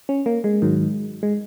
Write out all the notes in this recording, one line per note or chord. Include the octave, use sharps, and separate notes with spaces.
C#4
A#3
G#3
G#2 D#3 F#3
G#3